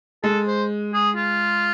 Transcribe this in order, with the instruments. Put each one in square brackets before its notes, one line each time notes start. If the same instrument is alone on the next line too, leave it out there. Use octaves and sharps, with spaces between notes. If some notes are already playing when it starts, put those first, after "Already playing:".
[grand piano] G#3 [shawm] A4
[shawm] C5
G#4
F4